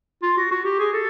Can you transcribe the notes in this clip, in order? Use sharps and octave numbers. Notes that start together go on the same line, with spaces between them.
F4
F#4
F#4
G4
G#4
A4